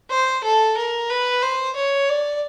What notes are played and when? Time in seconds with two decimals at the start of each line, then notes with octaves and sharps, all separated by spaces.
0.10 C5
0.44 A4
0.77 A#4
1.10 B4
1.43 C5
1.76 C#5
2.09 D5